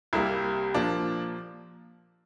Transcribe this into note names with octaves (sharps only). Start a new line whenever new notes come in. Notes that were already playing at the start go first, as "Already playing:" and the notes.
C2 C3 G3 A#3 E4
A#2 F3 A#3 D4